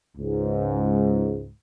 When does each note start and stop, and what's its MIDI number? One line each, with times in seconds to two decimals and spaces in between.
0.17 1.50 37
0.17 1.50 44